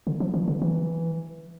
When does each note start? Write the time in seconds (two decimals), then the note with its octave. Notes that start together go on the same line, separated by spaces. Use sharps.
0.07 D3
0.20 F3
0.34 E3
0.48 D3
0.62 E3